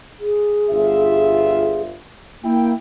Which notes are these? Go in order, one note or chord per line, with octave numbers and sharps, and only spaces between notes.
G#4
G1 F4 E5
A#3 E4 G5